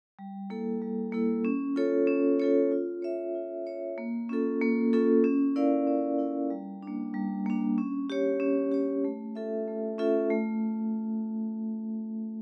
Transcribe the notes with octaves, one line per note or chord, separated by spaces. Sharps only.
G3
A#3 E4 A4
G3
A#3 E4 A4
C#4
F4 A4 C#5
C#4
F4 A4 C#5
F4
C#5 E5
F4
C#5 E5
A#3
C#4 F4 A4
A#3
C#4 F4 A4
C#4
E4 A#4 D5 F5
C#4
E4 A#4 D5 F5
G3
A#3 D4
G3
A#3 D4
C#4
G4 C#5
C#4
G4 C#5
A3
C#4 F4 A4 E5
A3
C#4 F4 A4 E5
A3